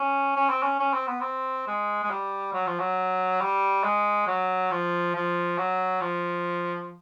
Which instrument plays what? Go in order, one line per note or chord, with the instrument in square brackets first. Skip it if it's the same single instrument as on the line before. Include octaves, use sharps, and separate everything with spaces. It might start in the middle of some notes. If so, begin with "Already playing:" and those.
Already playing: [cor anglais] C#4
C#4
C4
C#4
C#4
C4
B3
C4
G#3
G#3
G3
F#3
F3
F#3
G3
G#3
F#3
F3
F3
F#3
F3